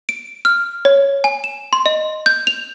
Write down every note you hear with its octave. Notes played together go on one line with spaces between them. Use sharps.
D7
F6
C#5
G#5
E7
C6
D#5
G6
F7